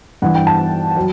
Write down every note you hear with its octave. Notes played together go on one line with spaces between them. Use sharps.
G2 E3 F#5
G5
A5
F#3